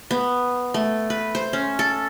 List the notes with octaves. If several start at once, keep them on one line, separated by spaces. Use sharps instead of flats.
B3
A3
B4
C5
C#4
A4